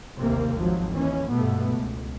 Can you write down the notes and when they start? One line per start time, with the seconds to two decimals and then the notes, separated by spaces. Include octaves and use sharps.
0.19 A1 D#2 C3 A#3
0.55 G#1 F3 F#3
0.93 D#2 E3 C#4
1.29 G2 B2 A3 B3
1.70 C#2